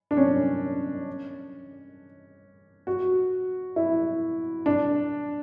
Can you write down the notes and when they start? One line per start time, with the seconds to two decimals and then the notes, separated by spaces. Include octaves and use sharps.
0.11 D4
0.17 C#4
2.87 F#4
3.76 E4
4.66 D4